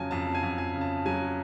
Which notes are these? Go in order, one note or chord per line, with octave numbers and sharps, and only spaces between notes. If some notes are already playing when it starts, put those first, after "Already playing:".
Already playing: F2 C#3 F#3 G#5 A5
F2 A5
G#5
F2
G#5
C#3
A5
F#3 G#5